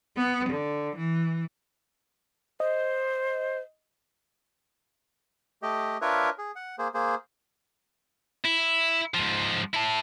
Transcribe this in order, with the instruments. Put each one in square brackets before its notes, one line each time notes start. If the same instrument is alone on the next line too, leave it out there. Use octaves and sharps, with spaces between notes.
[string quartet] B3
D3
E3
[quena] C5 [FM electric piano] D#5
[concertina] A3 G4 D#5
D4 F4 A#4 B4 C#5 E5
G#4
F#5
A#3 G#4 C5
A#3 G#4 C5
[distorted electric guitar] E4
G#2 F3
E4 A5